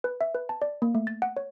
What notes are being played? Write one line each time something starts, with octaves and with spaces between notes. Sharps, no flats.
B4
E5
B4
A5
D5
A#3
A3
A6
F#5
C#5